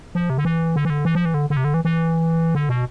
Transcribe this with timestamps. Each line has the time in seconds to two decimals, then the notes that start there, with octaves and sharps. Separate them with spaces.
0.15 F3
0.30 C3
0.38 D3
0.45 E3
0.76 D3
0.85 E3
0.90 D3
1.05 E3
1.15 F3
1.25 E3
1.34 D3
1.50 D3
1.57 C3
1.64 D3
1.74 E3
1.85 E3
2.55 D3
2.69 B2